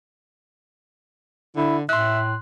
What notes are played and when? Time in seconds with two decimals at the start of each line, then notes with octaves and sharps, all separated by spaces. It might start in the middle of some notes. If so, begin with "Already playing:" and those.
1.56 D3 E4
1.89 A2 E5 C6 F#6